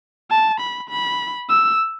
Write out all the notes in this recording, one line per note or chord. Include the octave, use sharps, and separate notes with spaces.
A5
B5
B5
E6